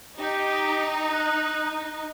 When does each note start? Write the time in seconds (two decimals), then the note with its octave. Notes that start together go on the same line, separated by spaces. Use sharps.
0.20 D#4 G4
1.12 F#6